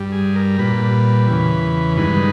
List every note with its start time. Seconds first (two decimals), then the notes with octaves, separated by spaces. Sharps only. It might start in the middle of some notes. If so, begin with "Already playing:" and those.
Already playing: G2 G3
0.12 G#4
0.36 A#4
0.59 A#2 G3 B4
1.28 E2 C#3 E3
1.97 G2 D#3 G#3 B4